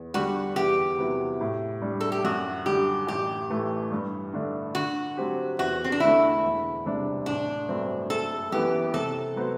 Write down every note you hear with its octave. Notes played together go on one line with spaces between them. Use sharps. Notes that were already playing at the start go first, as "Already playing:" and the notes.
Already playing: E2
D3 G3 D4 F#4 G4
E2 G4
C3 F#3 B3 E4
A2
G3 D4
A4
G4
F#2 F#4
D3 G3 G4
A1 G4
A2 E3 A3
G2
D3 A3 D4
D3 F#4
F#3 C4 G4
E2 F#4
C4
D4
D3 A3 E4
E1
D2 C3 G3 D4
A1 D4
G2 F#3 A3 C4
F#1 A4
F#2 E3 B3 G4
C3 A4
F#3 B3 F#4 C5